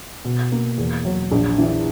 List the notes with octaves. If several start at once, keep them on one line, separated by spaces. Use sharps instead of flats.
B2
A#3
E2
F#3
A#1
E3